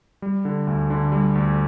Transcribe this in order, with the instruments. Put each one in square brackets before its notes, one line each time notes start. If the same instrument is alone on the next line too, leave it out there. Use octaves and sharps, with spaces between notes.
[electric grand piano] G3
D3
D2
D3
G3
D2